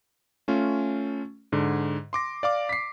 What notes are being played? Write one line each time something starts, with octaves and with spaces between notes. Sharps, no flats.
A3 C#4 F4
G#2 D3
C6 D6 A#6
D5 F5 D6
B6 C7